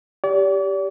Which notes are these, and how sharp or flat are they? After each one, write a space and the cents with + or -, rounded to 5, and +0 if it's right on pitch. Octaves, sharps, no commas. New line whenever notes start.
G4 +0 D5 -40